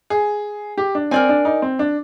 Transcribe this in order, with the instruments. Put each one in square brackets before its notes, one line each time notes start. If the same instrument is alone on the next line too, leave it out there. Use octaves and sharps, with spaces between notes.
[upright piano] G#4
G4
D4
[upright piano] C4 [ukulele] A#4 D5 G#5
[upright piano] D4
D#4
C4
D4